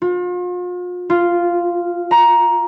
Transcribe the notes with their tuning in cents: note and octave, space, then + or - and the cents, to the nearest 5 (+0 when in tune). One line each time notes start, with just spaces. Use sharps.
F4 +40
F4 -5
A#5 +15